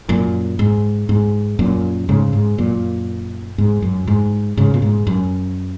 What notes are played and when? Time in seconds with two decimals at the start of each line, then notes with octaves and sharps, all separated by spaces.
0.09 F#2 A#2
0.59 G#2
1.09 G#2
1.59 F#2 A#2
2.09 G#2 C#3
2.33 G#2
2.58 F#2 A#2
3.58 G#2
3.82 F#2
4.07 G#2
4.57 G#2 C#3
4.74 A#2
4.82 G#2
5.07 F#2